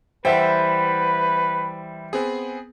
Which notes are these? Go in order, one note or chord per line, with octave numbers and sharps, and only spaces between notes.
E3 G3 A4 B4 C5 E5 F#5 G5
B3 C4 G#4